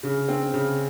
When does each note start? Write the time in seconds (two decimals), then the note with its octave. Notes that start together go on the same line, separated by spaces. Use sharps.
0.03 C#3
0.28 C4
0.54 C#3